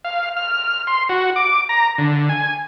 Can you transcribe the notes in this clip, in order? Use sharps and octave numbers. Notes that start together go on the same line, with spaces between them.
F5
F6
C6
F#4
D6
A#5
D3
G#5